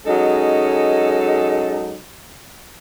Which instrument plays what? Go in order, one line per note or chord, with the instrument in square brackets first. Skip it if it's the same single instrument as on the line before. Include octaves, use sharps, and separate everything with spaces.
[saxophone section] F#3 G#3 C#4 D#4 A4